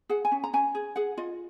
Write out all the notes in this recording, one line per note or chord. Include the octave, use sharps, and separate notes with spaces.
G#4 F#5
G#5
C#4
A#5
C#4 G#5
G#4
G#4 F#5
F4 D#5